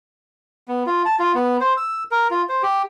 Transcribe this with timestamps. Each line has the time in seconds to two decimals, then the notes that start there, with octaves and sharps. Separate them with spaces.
0.68 B3
0.86 F4
1.05 A5
1.19 F4
1.35 B3
1.61 C5
1.77 E6
2.11 A#4
2.31 F4
2.49 C5
2.63 G4